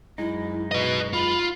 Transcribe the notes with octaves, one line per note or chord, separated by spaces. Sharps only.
F#2 G#3 D#4 E4
F#4 B4 D#5
F4 B5